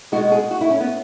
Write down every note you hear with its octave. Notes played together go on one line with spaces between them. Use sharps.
B2 G#3 F#4
G#4
F#4
E4
C#4
B3